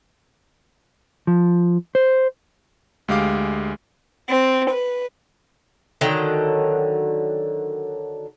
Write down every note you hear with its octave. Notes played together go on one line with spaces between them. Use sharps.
F3
C5
D2 G#3 G4 F5 D6
C4
B4
D3 D#3 F#3 G5